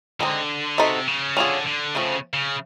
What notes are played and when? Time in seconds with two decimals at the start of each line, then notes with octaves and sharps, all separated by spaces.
0.20 D3 G#3 C4 D#4
0.78 C3 D#4 F#4 A4 C5 E5
1.07 C#3
1.37 D3 C#4 F4 G#4
1.66 D3
1.95 C#3 F3 A3 C4
2.34 C#3